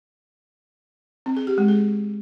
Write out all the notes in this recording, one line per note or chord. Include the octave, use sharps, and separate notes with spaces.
C4
G#4
G4
G#3
G#4